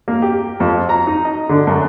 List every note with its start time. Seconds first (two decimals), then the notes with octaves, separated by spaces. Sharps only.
0.08 A#3
0.22 G4
0.60 F2
0.89 A#5
1.07 D#4
1.25 D#5
1.49 D3
1.67 F#2